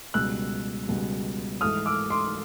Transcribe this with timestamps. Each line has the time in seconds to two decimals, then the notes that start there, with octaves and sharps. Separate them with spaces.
0.14 C#2 B2 G3 E6 F#6
0.88 C#2 B2 G3
1.61 G#2 E3 A3 D#6 F6
1.86 D6 E6
2.10 C6 D6